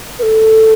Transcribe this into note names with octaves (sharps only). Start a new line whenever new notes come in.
B4
A4